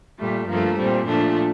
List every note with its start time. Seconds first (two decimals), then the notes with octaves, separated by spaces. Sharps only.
0.18 A#2 G3 A3
0.48 G2 F3 A3 A#3
0.76 A#2 G3 C4
1.06 A#2 F3 A3 D4